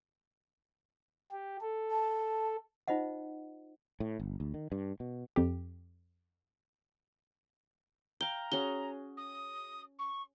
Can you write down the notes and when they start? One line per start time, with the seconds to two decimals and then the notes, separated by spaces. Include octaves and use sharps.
1.32 G4
1.61 A4
1.91 A5
2.88 D#4 F4 C5 D#5 F#5
4.00 A2
4.20 G1
4.40 D2
4.54 D#3
4.72 G2
5.00 B2
5.36 F2 G4
8.21 F5 G5 A#5 G7
8.52 C#4 F#4 G#4 G7
9.17 D#6
9.99 C#6